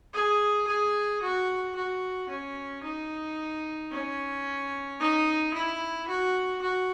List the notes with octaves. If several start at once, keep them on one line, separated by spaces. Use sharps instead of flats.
G#4
G#4
F#4
F#4
C#4
D#4
C#4
D#4
E4
F#4
F#4